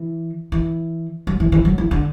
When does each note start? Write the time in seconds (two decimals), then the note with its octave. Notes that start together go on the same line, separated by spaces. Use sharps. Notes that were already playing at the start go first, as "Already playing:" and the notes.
Already playing: E3
0.52 E3
1.27 F#3
1.40 E3
1.52 E3
1.65 F#3
1.78 E3
1.91 D3